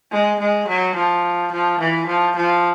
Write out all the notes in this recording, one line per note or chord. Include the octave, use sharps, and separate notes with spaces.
G#3
G#3
F#3
F3
F3
E3
F3
F3